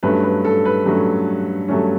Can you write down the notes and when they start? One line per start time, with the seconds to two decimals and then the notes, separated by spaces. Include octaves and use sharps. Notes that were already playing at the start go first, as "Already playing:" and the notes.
0.03 G2 F#3 A3 C#4 B4
0.23 B4
0.45 A4
0.65 B4
0.85 G2 F#3 A3 C#4
1.68 G2 F#3 A3 C#4